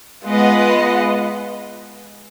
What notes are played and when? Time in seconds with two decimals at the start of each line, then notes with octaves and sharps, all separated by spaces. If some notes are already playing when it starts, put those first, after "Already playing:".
0.25 G#3 B3 F4 B4 D#5 F#5